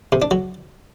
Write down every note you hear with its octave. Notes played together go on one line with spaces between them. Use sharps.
C3
D4
F#3